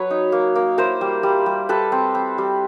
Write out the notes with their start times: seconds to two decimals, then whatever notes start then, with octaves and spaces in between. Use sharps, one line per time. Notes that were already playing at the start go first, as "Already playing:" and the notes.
Already playing: F#3 B4 C#5
0.10 D#4
0.32 A#3
0.55 A#3
0.78 E4 A#4 C5
1.01 G3
1.23 G3
1.46 G3
1.69 G3 A4 B4
1.92 C4
2.15 C4
2.38 G3